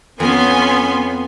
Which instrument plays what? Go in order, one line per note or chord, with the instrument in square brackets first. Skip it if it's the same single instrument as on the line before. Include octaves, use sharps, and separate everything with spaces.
[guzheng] F2 [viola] B3 [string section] C#4 G#5 C6